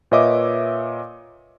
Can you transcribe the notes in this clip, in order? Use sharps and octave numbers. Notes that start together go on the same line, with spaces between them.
A#2 B4 C#5 D#5 E5 D6